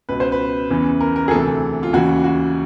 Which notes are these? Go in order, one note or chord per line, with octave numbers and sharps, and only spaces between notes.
C#2 B2 B4
C5
B4
E2 C#3 E3
A#4
A#4
G#4
D2 C3 E3 A4
F4
D#2 C#3 E3 F#4
F#4